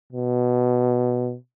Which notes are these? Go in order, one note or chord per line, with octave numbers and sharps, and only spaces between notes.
B2